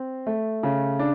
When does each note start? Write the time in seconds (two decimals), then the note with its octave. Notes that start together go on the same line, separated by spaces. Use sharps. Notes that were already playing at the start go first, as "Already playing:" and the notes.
Already playing: C4
0.26 A3
0.63 C#3
0.99 D4